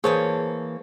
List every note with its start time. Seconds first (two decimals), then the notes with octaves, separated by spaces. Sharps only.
0.04 E3 A#3 G#4 C5 C#5 A5